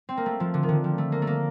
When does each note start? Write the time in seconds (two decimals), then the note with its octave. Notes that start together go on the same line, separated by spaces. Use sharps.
0.09 C4
0.17 A#3
0.26 A3
0.40 F3
0.54 D3
0.63 D#3
0.69 D3
0.84 F3
0.98 A3
1.12 A#3
1.22 A3
1.27 A#3